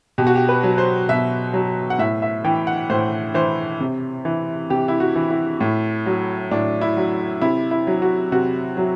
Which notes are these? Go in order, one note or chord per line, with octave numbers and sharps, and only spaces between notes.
B2 G4
F#4
G4
B4
F#3
C5
B2 E5
F#3
F#5
A2 E5
E5
E3 G5
F#5
A2 C5
E3 C5
C3
E3
C3 G4
E4
F#4
E3
E4
A2
F#3
A2 D4
E4
F#3
C3 E4
E4
F#3
F#4
C3 F#4
F#3